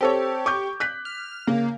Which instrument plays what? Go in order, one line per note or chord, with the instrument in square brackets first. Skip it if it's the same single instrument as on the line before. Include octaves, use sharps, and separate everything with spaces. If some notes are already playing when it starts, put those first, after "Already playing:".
[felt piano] C4 A4 C#5 [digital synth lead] G4
[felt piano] C#6 D6 G6
F#6 B6
[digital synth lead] F6
[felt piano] C#3 [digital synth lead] A#3